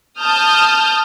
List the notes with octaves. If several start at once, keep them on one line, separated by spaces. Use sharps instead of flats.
A5 D#6 F6 G6